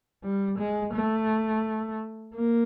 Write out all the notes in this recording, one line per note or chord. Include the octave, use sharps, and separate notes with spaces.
G3
G#3
A3
A#3